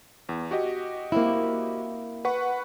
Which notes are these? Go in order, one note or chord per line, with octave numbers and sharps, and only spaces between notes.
E2
F#4 G4 D#5
A#3 C4 E4
B4 F#5 C#6